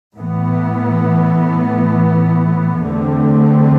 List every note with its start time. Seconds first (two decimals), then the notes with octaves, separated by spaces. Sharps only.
0.15 A2 E3 B3
2.82 E2 D3 A3 C4